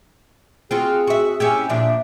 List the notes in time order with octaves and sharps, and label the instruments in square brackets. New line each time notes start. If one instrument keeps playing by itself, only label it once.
[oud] C4 F4 F#4 [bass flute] G#4
[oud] F#4 E5
C#4 E4 G4
[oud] A#2 F3 D4 [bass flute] E5